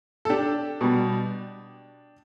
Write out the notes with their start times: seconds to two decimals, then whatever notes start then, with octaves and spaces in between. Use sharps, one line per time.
0.25 A4
0.30 D4 G4
0.81 B2 G3